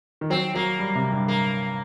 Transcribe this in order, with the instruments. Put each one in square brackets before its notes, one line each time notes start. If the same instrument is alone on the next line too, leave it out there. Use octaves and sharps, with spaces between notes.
[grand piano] D#3
[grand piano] F#3 [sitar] C4
[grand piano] F#3 [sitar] A#3
[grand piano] G3
C3
G2
[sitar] A#3